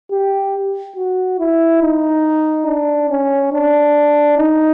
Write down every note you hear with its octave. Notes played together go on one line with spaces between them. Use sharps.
G4
F#4
E4
D#4
D4
C#4
D4
D#4